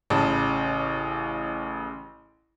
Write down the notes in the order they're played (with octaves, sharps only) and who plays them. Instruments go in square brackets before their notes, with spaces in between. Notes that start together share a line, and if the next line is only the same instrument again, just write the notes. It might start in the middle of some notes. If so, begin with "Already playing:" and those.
[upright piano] A1 C#3 A5